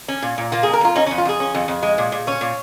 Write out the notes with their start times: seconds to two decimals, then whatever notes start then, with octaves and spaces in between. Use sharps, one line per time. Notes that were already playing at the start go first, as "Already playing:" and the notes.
0.08 C#4
0.22 A#2
0.38 A#2
0.52 A#3 F4
0.63 F2 G#4
0.73 A#4
0.81 F2 F4
0.95 C#4 D#4
1.06 F2 C#4
1.18 F4
1.25 F2 G#4
1.40 C#4
1.55 F2
1.68 F2
1.83 G#3
1.98 A#2
2.12 A#2
2.27 C#4 C#5
2.41 A#2